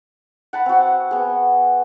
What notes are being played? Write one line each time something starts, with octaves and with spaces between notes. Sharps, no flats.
F#5 A5 B5
C4 F#4
B3 G#4